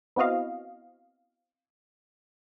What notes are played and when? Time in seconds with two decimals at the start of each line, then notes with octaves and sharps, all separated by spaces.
0.16 B3 C4 E4 F#4 D#5 F5